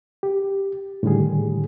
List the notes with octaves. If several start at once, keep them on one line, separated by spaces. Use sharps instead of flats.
G4
A2 D3 D#3 G3 G#4